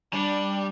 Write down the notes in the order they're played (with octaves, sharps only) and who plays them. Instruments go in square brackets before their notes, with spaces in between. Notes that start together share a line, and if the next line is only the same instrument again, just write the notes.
[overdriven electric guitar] G3 [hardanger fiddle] D4